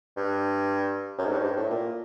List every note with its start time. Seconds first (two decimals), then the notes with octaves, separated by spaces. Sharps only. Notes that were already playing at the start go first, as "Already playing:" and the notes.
0.17 G2
1.18 F#2
1.25 G#2
1.32 G2
1.38 G#2
1.44 G2
1.57 A2
1.70 A#2